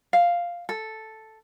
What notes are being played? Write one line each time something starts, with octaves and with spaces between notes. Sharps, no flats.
F5
A4